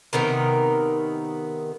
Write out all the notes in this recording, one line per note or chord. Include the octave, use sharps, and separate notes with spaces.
C3 D#3 B3 A#4